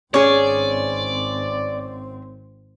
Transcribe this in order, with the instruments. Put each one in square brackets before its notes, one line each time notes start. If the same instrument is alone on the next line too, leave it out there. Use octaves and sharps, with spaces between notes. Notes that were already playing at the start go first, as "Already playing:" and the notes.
[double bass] G#1 C4 [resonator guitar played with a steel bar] C#4 G#4 [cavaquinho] C#5 [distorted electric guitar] D5